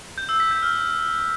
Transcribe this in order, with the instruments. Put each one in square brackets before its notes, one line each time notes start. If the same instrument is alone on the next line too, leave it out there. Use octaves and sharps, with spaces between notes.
[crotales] G6
E6
B6
G6
F6